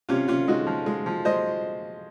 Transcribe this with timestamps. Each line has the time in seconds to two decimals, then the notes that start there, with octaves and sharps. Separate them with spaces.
0.09 C3 C#4 F4
0.28 C3 C#4 F4
0.48 G#3 D#4 F#4
0.67 F3
0.86 G#3
1.06 F3
1.25 G#3 C5 D#5